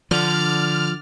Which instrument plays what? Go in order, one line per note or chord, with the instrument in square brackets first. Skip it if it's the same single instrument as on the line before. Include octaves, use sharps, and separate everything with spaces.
[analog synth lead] D3 [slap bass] F3 [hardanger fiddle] D5 [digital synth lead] F6